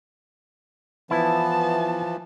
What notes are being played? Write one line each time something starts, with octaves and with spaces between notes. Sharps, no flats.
E3 F3 B3 E4 A5